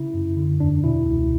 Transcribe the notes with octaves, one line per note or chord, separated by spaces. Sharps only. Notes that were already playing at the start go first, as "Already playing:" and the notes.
Already playing: C#3 E4
F#2
D3
E2 D4
B2 E4
C#2